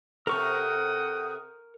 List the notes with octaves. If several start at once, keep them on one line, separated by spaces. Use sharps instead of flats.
C3 A4 A#4 F#5 G5 C#6 D#6